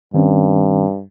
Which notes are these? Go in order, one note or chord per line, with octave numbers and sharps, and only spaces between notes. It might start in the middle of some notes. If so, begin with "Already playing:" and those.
G2 D#3 C4 C#4